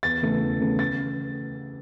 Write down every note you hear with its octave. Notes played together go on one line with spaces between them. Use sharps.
E2 A6
C#3 E3 A3
E2
C#3 E3 A3
A6